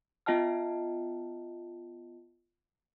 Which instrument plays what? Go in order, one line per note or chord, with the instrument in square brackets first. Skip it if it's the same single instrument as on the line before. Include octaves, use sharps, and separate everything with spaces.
[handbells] B3 F4 D#5 G5 A5 F6